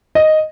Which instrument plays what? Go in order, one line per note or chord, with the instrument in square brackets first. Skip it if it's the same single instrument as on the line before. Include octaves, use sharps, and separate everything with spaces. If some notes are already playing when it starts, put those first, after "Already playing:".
[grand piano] D#5